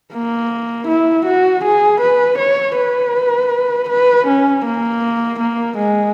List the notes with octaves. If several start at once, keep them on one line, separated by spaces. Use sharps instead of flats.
A#3
E4
F#4
G#4
B4
C#5
B4
B4
C#4
A#3
A#3
G#3